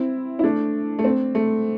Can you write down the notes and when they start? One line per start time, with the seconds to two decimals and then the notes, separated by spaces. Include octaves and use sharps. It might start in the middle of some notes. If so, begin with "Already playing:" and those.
Already playing: C4 E4
0.39 E4
0.43 A3 D4
0.99 A3
1.04 C4
1.35 A3